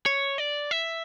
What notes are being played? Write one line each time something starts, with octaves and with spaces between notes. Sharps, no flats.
C#5
D5
E5